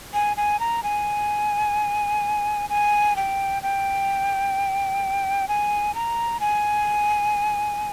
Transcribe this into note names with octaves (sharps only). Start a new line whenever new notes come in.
G#5
G#5
A#5
G#5
G#5
G5
G5
G#5
A#5
G#5